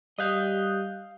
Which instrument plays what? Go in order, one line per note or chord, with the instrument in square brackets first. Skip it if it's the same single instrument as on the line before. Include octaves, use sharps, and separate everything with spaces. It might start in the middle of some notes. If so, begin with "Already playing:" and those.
[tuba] G3 [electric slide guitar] D#5 F5 [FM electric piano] D#6 F#6 G6